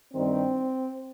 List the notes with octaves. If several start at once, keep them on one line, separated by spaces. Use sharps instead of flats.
G2 D#3 G3 C4